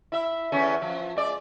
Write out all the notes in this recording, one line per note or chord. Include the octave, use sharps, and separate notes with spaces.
E4 E5
E2 A3 C#4
F3
G#3 D5